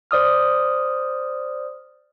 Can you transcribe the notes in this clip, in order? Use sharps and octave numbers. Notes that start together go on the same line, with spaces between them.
C5 D5 D#6 F6